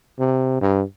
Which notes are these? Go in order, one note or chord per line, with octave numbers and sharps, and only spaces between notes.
C3
G2